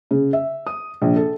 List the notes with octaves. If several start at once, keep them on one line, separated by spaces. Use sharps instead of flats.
C#3
E5
D#6
A#1
A4